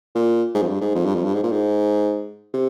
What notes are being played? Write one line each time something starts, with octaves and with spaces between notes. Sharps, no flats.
A#2
G#2
F2
G2
G#2
F2
G2
F2
G2
G#2
A#2
G#2
C3